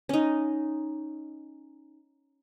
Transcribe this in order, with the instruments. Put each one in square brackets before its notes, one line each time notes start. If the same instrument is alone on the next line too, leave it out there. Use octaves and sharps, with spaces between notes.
[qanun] C#4 D#4